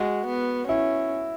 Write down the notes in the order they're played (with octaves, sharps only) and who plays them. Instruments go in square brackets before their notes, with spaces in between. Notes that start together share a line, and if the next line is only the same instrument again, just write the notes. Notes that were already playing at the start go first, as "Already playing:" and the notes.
Already playing: [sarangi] G#3 [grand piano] F#4
[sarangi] B3
[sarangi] C#4 [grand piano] E4